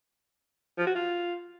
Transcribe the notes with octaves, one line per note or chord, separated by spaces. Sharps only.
F3
F#4
F4